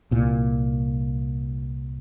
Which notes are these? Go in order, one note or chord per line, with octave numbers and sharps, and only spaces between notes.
C2 A#2